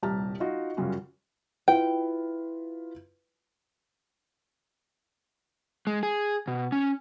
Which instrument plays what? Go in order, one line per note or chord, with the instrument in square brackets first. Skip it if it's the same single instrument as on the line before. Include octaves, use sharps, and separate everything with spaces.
[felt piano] D#1 C2 G4 A5 A#5 F6
D#4 F4 F#4
F#2 C#3 G3 C#4 F4 F#4
[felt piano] E4 F4 B4 [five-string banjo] G5
[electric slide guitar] G#3
G#4
B2
C#4